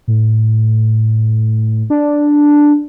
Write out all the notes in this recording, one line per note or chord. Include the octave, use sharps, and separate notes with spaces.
A2
D4